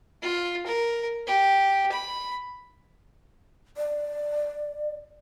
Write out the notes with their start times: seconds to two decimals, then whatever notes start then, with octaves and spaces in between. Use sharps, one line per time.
0.23 F4
0.66 A#4
1.27 G4
1.92 B5
3.77 D5